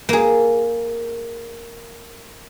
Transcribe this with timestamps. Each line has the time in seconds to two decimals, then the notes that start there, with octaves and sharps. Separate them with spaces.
0.09 A#3 G#4